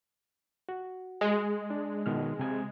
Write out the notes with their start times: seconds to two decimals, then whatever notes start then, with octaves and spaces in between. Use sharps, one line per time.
0.69 F#4
1.21 G#3
1.70 D4
2.06 B2 D#3 F6
2.39 C3 G#5 G#6